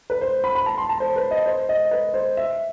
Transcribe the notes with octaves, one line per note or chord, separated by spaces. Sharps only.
B4
C5
B5
B5
A5
C6
A5
C5
B4
D#5
C5
D#5
B4
C5
E5